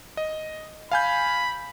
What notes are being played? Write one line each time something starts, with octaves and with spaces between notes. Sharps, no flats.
D#5
F5 G#5 B5 G6